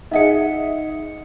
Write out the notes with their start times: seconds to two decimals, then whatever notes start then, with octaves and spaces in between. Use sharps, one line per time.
0.11 D#4 G#4 D#5 E5 F#5 C#7